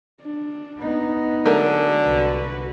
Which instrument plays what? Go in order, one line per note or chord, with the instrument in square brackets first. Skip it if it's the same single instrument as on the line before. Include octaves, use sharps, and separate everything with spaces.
[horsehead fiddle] D4
[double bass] B3 D#4
[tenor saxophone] D3 [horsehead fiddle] F#3 G#3 [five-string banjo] A3 A#4
[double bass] C2 [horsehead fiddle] F#4 B4